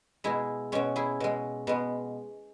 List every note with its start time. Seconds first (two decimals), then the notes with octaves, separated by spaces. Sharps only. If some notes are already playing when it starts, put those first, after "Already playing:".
0.24 B2 G#3 E4 G#4
0.72 B2 G#3 C#4
0.96 E4 G#4
1.20 B2 G#3
1.67 B2 G#3 B3